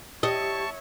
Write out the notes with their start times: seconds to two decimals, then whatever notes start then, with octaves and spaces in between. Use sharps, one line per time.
0.23 G4 C#5 D#5 E5 A5 C#6